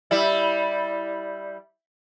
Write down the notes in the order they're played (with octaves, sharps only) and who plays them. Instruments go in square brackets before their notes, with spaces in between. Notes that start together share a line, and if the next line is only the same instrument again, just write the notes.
[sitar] G3 E4